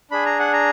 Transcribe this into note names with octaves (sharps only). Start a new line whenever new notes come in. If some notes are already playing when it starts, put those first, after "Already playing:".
D4 G#4 B5
A#5
F#5
A#5